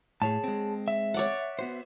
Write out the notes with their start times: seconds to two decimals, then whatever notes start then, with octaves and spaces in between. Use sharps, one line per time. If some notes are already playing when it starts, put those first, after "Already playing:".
0.22 A2 G#4 C#5 A5
0.44 G#3 C4
0.88 E5
1.14 C#5 D5 F#5
1.59 B3 F#4 C5